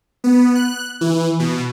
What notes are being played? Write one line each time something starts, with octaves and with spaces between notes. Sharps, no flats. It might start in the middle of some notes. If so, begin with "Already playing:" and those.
B3
F#6
E3
B2